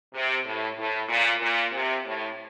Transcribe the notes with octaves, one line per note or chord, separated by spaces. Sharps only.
C3
A2
A2
A#2
A#2
C3
A2